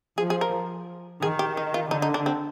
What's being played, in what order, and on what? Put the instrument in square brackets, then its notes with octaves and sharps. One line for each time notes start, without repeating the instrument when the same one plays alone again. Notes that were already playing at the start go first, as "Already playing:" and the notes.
[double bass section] F3 [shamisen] G#4
[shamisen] G#4
A#4
[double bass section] D#3 [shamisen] G#4
[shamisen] G4
D#4
F4
[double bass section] D3 [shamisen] D#4
[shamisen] D#4
D4
C4